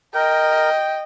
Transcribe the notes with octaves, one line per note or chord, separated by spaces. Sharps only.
A#4 D#5 G5